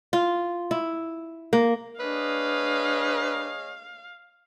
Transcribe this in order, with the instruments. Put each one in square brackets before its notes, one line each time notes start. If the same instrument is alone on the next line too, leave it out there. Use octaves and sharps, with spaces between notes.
[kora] F4
E4
A#3
[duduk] D4 [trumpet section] G#4 C#5 D#5 [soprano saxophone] B4 [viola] F5